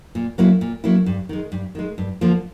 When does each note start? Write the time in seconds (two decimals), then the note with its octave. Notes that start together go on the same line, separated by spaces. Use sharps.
0.15 A#2
0.38 F#3 A#3 C#4 E4
0.61 A#2
0.84 F#3 A#3 C#4 E4
1.06 G2
1.29 D#3 G#3
1.52 G2
1.75 D#3 G#3
1.98 G2
2.21 D3 F3 A#3